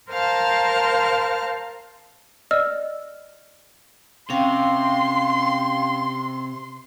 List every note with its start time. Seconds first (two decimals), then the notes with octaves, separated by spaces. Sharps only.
0.11 A#4 C5 F5 A5 F6
2.51 D5 D#5 E6 F6
4.30 C3 C#4 F5 G5 C6